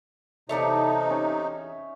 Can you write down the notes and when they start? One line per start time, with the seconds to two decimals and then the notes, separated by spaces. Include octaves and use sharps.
0.49 E2 C3 D#4 A4 C#5 D5 E5
1.10 C#4